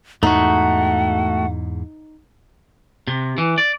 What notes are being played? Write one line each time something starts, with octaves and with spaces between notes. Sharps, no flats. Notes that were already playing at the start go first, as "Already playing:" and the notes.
E2 G#2 A3 D#4 F#4 F#5
C3
E3
D5